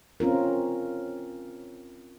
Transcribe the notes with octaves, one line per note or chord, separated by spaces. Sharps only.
C4 C#4 F4 A#4